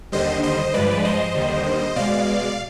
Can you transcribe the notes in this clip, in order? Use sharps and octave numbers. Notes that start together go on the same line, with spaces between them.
D#2 D3 G3 C5 D#5
C5 D#5
G2 F3 G#3 B4 D5
C5 D#5
D#2 D3 G3
B2 G#3 D5 F5